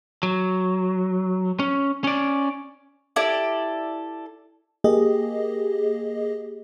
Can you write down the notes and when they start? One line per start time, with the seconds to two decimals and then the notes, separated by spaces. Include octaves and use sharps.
0.23 F#3
1.59 C#4
2.04 C#4 D5
3.16 E4 G4 A4 D5
4.84 A#3 G4 G#4 D#5